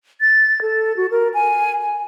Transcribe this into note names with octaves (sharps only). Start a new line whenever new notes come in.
A6
A4
F#4
A#4
G#5
G#5